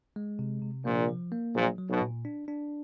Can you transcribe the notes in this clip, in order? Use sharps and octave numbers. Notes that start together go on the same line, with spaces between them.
G#3
C3
C3
A#1 A#2 A#3
F3
A#3
A#1 A#2 F#3
F#3
B1 B2
A#2
D4
D4